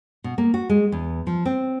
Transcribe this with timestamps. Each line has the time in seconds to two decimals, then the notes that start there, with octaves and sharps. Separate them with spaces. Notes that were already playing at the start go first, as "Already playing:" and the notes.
0.24 B2
0.38 A#3
0.54 F#4
0.69 G#3
0.92 E2
1.27 F3
1.45 C4